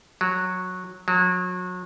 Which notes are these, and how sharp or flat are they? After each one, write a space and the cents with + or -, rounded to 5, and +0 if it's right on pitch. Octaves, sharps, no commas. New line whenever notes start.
F#3 -15
F#3 -35